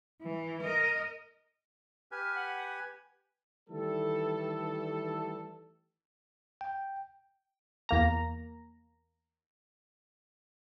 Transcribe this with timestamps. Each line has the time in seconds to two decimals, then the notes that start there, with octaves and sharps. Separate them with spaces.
0.22 E3
0.63 A#4 D#5
2.12 G4 B4 G#5 F6
2.35 F#5
3.69 D#3 E3 G3 A3 A4
6.61 G5
7.89 E2 A#3 A#5